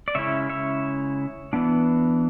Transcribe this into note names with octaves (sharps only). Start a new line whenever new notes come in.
D5
C#3 G#3 C#4 E4 C#5 E5
C#5 E5
E3 B3 D4